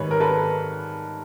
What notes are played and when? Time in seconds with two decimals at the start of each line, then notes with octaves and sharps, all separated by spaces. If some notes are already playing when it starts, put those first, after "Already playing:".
Already playing: G#2 D#3 G3 B4 C#5
0.11 A#4
0.20 A4 B4